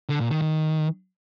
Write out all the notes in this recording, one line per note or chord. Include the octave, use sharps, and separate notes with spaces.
D3
A#2
D#3
D#3